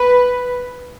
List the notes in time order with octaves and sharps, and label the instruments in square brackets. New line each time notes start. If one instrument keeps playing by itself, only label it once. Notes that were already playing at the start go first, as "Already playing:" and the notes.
Already playing: [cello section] B4